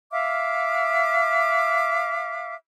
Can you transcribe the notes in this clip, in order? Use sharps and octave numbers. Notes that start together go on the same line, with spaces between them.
E5 F5 D6 F6